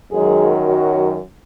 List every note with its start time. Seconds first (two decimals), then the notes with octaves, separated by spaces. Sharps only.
0.12 F#2 D#3 F#3 G#3 G#4
0.67 F#3 F#4